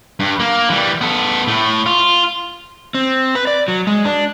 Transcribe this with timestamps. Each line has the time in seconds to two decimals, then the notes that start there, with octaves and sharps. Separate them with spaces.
0.20 G2
0.40 A#3
0.70 E3 G3
1.01 B3 A4
1.48 A2 A3
1.86 F4
2.95 C4
3.35 B4
3.47 D5
3.68 F#3
3.87 G#3
4.05 D4